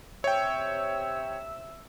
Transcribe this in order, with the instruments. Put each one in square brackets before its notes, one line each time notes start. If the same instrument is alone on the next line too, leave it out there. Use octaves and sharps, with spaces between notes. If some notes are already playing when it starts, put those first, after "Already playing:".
[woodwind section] C3 E5 E6 [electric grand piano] C#5 G5